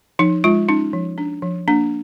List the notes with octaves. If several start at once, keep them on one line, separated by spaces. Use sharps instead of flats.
F3 D#4
G#3 F4
C#4 D#4
F3
D4
F3
A#3 D4